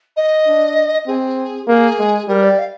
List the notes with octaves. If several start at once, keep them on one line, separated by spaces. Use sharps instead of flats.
D#5
D4
C4 G#4
A#3 G#4
G#3
G3 A#4
D5
F5